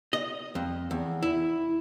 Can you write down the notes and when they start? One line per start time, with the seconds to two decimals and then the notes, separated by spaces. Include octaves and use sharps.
0.13 D#5
0.55 F2
0.91 E2
1.23 E4